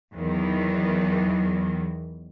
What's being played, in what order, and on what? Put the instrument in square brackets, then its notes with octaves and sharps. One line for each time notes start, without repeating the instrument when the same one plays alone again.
[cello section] E2 D#3 E3 F#3